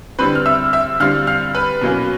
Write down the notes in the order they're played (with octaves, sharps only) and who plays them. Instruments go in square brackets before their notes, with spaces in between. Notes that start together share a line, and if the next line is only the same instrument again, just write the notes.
[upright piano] D3 G3 C4 B4 B5
F6
E5 E6
E5 E6
D3 G3 C4 F5 F6
F5 F6
B4 B5
B2 F#3 A#3 C#4